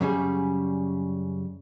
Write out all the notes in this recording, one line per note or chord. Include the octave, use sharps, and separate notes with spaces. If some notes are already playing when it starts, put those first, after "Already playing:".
F#2 C#3 G3 G#4